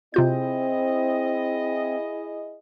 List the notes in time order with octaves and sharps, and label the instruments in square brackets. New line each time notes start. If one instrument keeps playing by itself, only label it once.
[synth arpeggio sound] C3 F4 G6 [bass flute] C4 [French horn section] E4 G#4 D#5